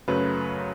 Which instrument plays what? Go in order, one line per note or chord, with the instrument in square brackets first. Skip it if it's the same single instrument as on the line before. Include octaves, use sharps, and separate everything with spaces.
[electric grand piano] F#2 C#3 F#3 A3 [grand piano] B4